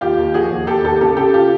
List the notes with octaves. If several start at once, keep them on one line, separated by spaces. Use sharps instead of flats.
D#2 F4 G4
D#2
F3 F#4 G#4
D#2
D#2 G4 A4
D#2 G4 A4
C#3 G4 A4
C#3 G4 A4
F4 G4